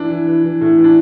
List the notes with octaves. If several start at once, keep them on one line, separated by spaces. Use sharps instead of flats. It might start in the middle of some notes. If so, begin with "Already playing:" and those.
Already playing: E3 D4
E3
E3
E3
A2
E3
D4